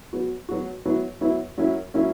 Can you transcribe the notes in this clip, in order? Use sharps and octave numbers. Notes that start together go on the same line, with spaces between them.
F#3 B3 F#4
F#3 B3 F#4
F#3 B3 E4
F#3 B3 E4
F#3 A#3 C#4 E4
F#3 A#3 C#4 E4